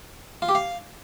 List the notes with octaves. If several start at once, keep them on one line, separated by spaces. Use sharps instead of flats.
F4
G4
F5